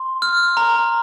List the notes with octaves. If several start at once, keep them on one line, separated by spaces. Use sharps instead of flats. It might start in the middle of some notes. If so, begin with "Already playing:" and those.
Already playing: C6
F6
A#5